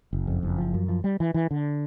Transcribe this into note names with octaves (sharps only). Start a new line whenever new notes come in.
F#1
F2
F#1
F3
F#2
F3
G3
E3
E3
D3